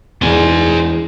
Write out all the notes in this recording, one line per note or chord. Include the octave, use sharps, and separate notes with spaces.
E1 E2 C5 G#5